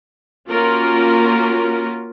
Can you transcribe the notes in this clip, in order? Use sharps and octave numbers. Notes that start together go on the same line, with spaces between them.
A#3 C#4 F4 F#4 A#4